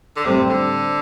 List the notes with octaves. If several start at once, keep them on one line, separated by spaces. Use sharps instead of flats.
D3
A2 C3 G3 C4
D3